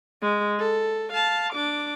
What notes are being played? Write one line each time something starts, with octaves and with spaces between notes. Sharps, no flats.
G#3
A4
F5 A5
D4 D6